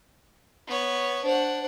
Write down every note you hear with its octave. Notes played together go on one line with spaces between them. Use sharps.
B3 C#5
D4 C5 F#5